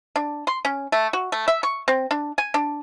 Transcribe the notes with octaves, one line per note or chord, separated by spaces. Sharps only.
D4
C6
C#4
A3
F#4
A3
E5
C#6
C4
D4
G#5
D4